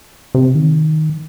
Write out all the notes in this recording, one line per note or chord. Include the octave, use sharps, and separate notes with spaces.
C3
D#3